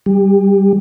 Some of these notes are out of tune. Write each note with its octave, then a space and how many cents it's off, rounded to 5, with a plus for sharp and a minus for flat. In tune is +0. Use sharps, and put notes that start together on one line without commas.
G3 -10 G4 +30